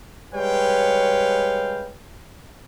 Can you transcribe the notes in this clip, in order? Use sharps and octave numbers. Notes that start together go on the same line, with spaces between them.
G3 G#3 B4 C#5 F5 G5